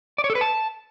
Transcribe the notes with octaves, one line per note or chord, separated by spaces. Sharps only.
D5
C#5
A4
B4
A5